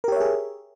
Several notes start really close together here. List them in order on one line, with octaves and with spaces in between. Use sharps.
A#4 G4 C#5 E5 G#4